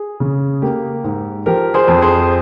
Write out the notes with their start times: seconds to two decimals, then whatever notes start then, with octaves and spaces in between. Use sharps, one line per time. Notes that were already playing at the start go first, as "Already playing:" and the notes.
Already playing: G#4
0.20 C#3
0.62 A#3 G4
1.04 G#2
1.46 F3 G4 A#4
1.74 G#4 C5
1.88 F2
2.02 G#4 C5